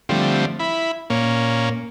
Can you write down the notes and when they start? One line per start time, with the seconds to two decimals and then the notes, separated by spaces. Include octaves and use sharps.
0.09 D3 F3 G3 A3 C4
0.60 E4 B5
1.10 A#2 A#3 C#4